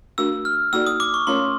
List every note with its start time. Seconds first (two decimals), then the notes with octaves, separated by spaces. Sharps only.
0.18 A3 D4 F#4 A#4 E6
0.45 F6
0.73 A#3 D#4 F#4 A4 D5 E6
0.87 D#6
1.00 D6
1.14 C#6
1.27 A3 C#4 F4 A#4 C#5 C6